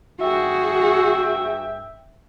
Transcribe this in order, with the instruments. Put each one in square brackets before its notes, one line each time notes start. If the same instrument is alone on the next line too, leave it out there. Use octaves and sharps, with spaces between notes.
[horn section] G2 E5 G5 [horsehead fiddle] F#4 G#4